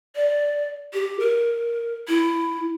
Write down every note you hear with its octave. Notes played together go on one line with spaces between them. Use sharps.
D5
G4
A#4
E4